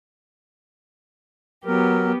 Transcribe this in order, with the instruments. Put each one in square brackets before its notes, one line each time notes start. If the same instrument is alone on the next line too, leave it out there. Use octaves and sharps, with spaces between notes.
[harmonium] F#3 A#4 [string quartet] B3 G4